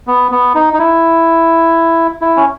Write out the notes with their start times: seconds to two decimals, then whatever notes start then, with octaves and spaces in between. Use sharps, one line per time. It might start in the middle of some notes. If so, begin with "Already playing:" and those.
0.07 B3
0.31 B3
0.55 D#4
0.73 D#4
0.79 E4
2.21 E4
2.37 C#4